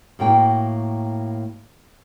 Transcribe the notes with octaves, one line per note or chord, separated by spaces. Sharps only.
A2 A#3 F#4 G5